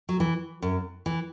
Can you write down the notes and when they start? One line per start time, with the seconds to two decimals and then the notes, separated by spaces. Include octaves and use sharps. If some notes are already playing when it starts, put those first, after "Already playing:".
0.09 F#3
0.20 E3
0.62 F#2
1.06 E3